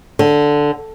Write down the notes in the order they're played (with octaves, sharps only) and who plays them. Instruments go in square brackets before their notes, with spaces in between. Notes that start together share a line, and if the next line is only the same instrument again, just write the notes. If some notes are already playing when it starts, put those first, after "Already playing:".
[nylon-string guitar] D3